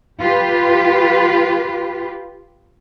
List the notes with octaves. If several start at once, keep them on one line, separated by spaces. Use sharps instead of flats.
F4 G4 B4